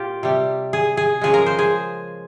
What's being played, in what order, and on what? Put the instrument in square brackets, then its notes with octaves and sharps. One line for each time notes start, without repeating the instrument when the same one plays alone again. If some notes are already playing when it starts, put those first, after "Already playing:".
Already playing: [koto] A#2 F4 G4
C3 G3
G#4
G#4
C#3 F3 G#3 G#4
A#4
C5
G#4